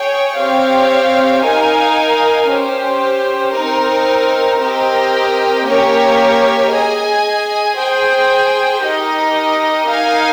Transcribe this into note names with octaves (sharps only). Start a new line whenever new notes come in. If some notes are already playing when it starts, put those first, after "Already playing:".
Already playing: G#4 C#5 G5
C4 G4 C#5 F5
D#4 A#4 F5 G#5
C#4 G4 C5
C4 D#4 A#4
C4 G4 A#4 D#5 G5
A#3 C#4 G4 A#4 C#5
G#4 D#5 G#5
G#4 C5 G5
D#4 G4 A#4 D#5
D#4 A#4 F5 G#5